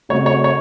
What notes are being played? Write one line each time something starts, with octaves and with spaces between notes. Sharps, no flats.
C#3 A3 C4 F#4 C#5
C#5
C#5